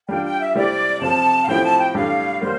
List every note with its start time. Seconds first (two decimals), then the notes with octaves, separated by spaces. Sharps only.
0.09 G3 D4 F4 G5
0.24 G5
0.40 E5
0.55 C3 G3 C4 E4 G4 D5
1.01 C3 F3 C4 F4 A5
1.44 F5
1.48 A2 F3 C4 E4 G4 G5
1.64 A5
1.79 G5
1.94 A2 G3 D4 G4 F5
2.41 G3 A#3 C5